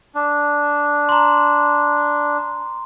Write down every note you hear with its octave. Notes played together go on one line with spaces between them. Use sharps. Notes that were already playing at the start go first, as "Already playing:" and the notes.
D4
A#5 C6